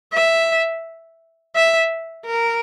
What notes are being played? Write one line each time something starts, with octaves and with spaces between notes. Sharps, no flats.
E5
E5
A#4